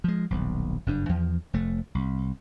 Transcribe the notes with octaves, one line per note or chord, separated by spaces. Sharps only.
F3 G#3
D#1 B1
F#1 G2 D4
E2 F3
F1 A3
C2